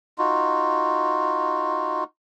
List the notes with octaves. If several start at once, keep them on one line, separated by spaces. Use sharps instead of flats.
D#4 F4 F#4